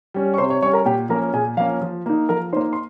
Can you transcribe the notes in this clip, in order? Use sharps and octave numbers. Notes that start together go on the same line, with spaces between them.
G3 C#4
C#6
C3 C5 C6
C#5 C#6
G3 C#4 C#5 C#6
A#4 A#5
A#2 G4 G5
F3 A#3 C#4 A#4 A#5
A#2 G#4 G#5
F3 A#3 C#4 F5
F3
A#3 D#4
F3 A#4 A#5
A#3 D#4 C5 C6
C6